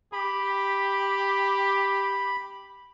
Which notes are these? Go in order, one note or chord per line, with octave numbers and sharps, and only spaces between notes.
G4 B5